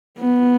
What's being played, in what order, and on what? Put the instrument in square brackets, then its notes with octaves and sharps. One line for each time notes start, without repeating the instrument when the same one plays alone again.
[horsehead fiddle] B3